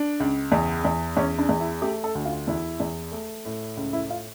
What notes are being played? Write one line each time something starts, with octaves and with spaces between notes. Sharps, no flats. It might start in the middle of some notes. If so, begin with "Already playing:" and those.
Already playing: D4
C#2
E2
E2
E2 C#4
D4
E2
E4
A3 G4
A4
D2
F4
E2 E4
E2
A3
A2
C#2
E4
F4